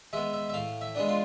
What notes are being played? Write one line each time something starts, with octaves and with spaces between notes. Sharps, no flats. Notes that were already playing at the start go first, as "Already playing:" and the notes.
G#3 B3 E5
E5
E5
A2 F5
E5
G#3 B3 D4
F4